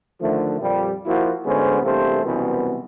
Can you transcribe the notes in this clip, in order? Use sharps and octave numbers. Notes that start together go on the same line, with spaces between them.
D3 D#3 F3 A3
F2 A#2 G3
F3 A#3 E4 F#4
D2 D3 G#3 B3 C#4 C5
E2 G2 C3 A3 A#3 C5
C2 F#2 B2 E3 B3